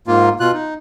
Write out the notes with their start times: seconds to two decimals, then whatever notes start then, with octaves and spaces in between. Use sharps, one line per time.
0.07 G#2 A#3 F4
0.40 B2 F4 F#6
0.53 D#4